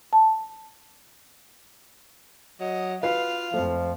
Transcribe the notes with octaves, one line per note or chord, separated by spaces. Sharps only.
A5
F#3 D#5
F4 F#4 B4 F5 C7
F2 F3 A3